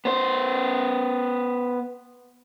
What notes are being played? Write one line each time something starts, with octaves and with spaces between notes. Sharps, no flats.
B3 C5